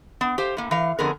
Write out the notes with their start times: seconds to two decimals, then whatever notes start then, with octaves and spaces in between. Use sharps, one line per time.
0.21 B3
0.38 G4 C5 F5
0.57 A2 A#3
0.71 E3 F5
0.99 F2 D3 B3 G#4 A#4